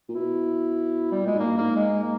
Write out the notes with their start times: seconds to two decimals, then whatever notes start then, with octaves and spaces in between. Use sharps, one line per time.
0.09 A#2
0.15 B2 E4
1.12 G3
1.22 A#2 G#3
1.35 G#2 A#3
1.47 G2
1.58 G#2 A#3
1.76 G#3
2.03 A#3